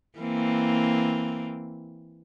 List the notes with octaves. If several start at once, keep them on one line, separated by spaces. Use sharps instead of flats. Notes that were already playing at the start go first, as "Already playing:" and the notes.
E3 A#3 C4